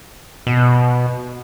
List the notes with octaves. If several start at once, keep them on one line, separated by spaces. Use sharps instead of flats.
B2